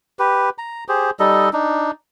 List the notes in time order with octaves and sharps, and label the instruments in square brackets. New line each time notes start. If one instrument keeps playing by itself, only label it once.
[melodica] G4 B4
A#5
G4 G#4 C5
G3 D#4 A4 D#5
D4 D#4